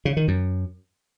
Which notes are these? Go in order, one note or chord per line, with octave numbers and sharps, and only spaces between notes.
C#3
D#3
F#2